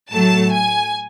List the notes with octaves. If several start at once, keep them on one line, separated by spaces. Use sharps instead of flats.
A2 F#3 A3 A5
G#5